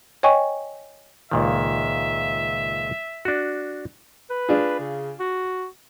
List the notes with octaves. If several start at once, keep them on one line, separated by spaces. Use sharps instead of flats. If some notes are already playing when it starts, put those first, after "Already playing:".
C#5 D#5 G5 G#5 C#6
C#2 A#2 D#3 E5
D4 F#4
B4
D4 F4 G#4
C#3
F#4